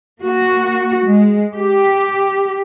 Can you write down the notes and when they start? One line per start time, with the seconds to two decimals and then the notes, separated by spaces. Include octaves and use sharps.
0.20 A#3 F#4
1.06 G#3
1.55 G4